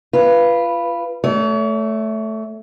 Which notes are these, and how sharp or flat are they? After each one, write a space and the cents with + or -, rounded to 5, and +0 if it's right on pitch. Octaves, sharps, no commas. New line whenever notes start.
F4 -25 B4 -5
A3 -5 C#5 +40